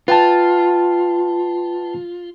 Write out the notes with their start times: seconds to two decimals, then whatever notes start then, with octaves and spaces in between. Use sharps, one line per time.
0.08 F4 B4 G5 A5